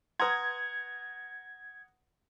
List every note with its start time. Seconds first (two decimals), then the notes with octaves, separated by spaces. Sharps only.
0.20 B4 F#5 A#5 C6 D#6 G#6